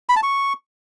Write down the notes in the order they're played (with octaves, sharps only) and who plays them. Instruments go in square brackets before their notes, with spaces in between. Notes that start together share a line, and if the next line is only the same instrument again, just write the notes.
[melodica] B5
A5
C#6